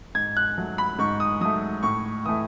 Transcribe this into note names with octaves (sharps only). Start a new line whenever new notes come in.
G#2 G#6
F#6
F#3 A3
B5
G#2 C#6
D#6
F#3 A3 D#6
A2 C#6
E3 A3 D#6